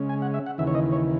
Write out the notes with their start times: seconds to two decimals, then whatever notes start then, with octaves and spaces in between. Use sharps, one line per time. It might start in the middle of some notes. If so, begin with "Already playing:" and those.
Already playing: C#3 G#3 C#4
0.09 G#5
0.22 F#5
0.34 E5
0.46 F#5
0.58 D#2 C#3 E3 E5
0.67 C#5
0.75 D#5
0.92 C#5